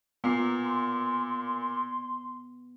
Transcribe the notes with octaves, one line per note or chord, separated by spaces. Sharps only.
A#2 B3 A#5 C7
C6